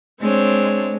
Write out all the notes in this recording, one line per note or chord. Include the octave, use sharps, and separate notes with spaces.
G#3 C4 D4 C#5